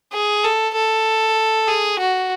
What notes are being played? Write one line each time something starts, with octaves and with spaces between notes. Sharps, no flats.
G#4
A4
A4
G#4
F#4